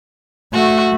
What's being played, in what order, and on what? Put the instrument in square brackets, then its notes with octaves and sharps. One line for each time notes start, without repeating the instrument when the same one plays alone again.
[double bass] A3 [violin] F#4